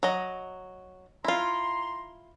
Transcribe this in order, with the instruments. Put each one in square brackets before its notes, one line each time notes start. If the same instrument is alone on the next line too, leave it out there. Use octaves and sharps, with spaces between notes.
[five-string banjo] F#3 D#5
[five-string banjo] E4 F4 [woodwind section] A#5 C6